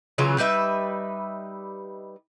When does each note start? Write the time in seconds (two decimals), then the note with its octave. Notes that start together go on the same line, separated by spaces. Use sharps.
0.18 C#3 E3 F#3 F4
0.38 G3 D#4 B4 E5